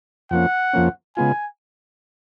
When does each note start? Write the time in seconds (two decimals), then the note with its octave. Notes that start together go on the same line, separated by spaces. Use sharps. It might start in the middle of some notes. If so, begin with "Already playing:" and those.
0.31 F2 F3 A#3 C#4 F#5
0.73 F2 F3 A#3 C#4
1.17 C#3 G#3 B3 F4 G#5